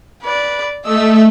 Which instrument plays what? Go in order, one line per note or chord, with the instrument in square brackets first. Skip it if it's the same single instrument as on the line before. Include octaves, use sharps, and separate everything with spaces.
[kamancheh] B4 D5
[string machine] A3 [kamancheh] D#5 E6